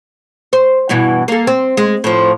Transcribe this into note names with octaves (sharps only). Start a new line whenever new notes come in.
C5
G2 B2 E3
A#3 A4
C4
G#3
A2 F3